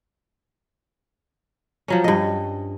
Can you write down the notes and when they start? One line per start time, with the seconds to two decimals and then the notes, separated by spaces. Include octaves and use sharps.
1.88 F3 F#3 C#4
2.04 G2 D#5